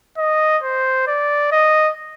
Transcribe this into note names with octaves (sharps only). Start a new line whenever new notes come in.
D#5
C5
D5
D#5